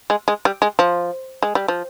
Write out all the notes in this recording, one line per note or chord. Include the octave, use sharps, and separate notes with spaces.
G#3
G#3
G3
G#3
F3
G#3
G3
F3